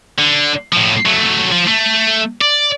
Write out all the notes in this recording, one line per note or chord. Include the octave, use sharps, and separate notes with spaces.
D3
A2 F3
F#3 A3
F3
A3
D5